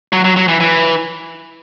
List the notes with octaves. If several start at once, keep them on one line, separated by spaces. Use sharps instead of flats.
F#3
F#3
F#3
E3
E3